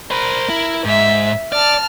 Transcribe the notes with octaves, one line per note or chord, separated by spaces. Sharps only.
A#4 C5 B5
E4
G#2 E5
D5 A5 F6